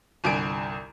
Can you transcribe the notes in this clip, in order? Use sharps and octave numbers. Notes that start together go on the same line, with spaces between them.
G1 C2 G#5 D7